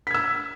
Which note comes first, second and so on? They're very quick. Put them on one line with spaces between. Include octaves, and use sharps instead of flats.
B6 G#6 E6